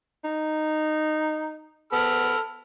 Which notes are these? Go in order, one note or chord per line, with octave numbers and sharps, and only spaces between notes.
D#4
B3 A4 B5 F6